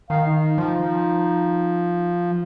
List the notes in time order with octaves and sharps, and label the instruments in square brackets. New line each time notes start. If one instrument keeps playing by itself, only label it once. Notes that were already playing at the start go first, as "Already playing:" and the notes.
[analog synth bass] D#3 [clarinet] F5
[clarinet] D#4
[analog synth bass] F3